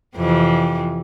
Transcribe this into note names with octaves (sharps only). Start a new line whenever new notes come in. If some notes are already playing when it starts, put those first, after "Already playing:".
F2 C3 E3